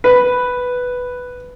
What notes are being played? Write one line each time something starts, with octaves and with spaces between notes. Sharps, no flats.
B4